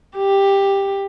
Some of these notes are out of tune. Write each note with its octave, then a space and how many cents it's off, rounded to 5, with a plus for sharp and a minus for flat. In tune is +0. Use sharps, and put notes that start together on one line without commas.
G4 +10